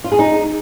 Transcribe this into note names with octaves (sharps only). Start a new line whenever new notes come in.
F4
G#4
D#4